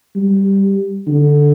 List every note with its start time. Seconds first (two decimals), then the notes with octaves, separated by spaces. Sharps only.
0.15 G3
1.07 D3